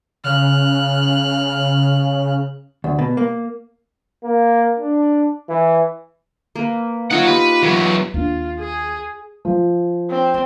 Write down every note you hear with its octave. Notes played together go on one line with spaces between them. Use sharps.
C#3 F6 F#6
D2
B2
A#3
A#3
D4
E3
A#3 B4
D#4 F4 C#5 F#5
G4 B4 A#5
E2 F#3 B4
D#2 D4 F4
G#4
F3
C4